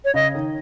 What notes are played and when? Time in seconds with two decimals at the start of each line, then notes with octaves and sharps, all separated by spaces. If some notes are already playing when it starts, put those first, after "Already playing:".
0.05 C#5
0.14 C#3 D#5
0.35 D#3